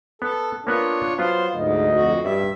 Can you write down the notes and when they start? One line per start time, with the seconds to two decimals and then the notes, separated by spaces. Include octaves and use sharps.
0.22 B3 A4
0.67 A#3 B3 D4 F4 B4 C#5
1.18 F#3 B3 F4 C5 F5
1.54 D2 G#2 D#5
1.93 F2 F#4
2.24 G2 E5